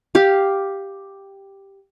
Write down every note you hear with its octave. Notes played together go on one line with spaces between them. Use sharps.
G4 F5